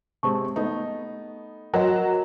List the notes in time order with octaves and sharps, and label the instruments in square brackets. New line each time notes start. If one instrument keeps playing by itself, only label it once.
[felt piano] C3 G#3 C4 [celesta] A5 [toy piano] C#6
[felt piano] A3 B3 D#4
[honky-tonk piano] F#3 [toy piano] F#4 A#5 [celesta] A#4 B4 D#5